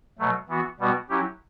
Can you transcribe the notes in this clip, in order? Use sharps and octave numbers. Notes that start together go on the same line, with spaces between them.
B2 F#3 A3
E3 B3 F#4
B2 G3 B3 F#4
F#3 C#4 E4 G4